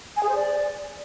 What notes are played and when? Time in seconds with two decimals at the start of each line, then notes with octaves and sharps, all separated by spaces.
0.17 G#5
0.23 G#4
0.29 C5
0.35 D5